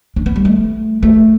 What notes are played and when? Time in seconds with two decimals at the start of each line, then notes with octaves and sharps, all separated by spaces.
0.16 D4
0.26 B3
0.36 G3
0.45 A3
1.03 A3